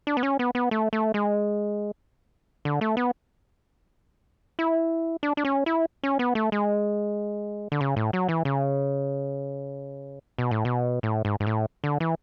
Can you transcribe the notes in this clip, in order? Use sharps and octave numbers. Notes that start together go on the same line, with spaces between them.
D4
B3
C#4
B3
B3
A3
A3
G#3
D3
A3
B3
E4
D4
D4
C#4
E4
C#4
B3
A3
G#3
D3
C#3
A2
F#3
E3
C#3
B2
A2
B2
A2
G#2
G#2
A2
D3
E3